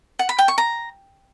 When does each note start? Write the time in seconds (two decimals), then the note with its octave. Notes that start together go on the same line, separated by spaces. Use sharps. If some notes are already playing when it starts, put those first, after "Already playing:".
0.19 F#5
0.29 B5
0.39 G5
0.48 C#6
0.58 A#5